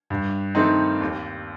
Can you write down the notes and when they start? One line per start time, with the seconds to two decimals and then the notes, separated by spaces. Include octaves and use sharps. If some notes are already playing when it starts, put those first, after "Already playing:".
0.10 G2
0.55 D#3 A3 C4 D#4
1.01 D#2